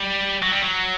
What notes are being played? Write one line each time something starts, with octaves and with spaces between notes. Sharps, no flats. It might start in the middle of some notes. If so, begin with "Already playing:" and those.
Already playing: G3
F#3
G3
F#3